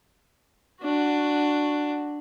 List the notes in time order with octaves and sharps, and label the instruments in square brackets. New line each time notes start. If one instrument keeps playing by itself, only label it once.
[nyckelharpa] D4 F#4